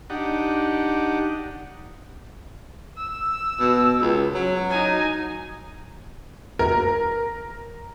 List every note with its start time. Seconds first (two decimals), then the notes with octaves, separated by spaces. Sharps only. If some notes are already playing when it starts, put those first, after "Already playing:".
0.10 D4 D#4 G4 F#5
2.97 E6
3.60 B2
4.01 C#2
4.35 F#3
4.70 D#4 G#5
6.59 A#4